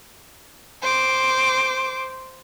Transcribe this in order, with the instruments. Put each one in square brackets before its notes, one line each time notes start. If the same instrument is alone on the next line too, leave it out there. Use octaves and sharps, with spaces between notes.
[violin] C5 D6